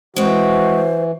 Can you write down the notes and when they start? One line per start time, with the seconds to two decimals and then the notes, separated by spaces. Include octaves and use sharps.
0.16 E3 G#3 C4 F#4 C5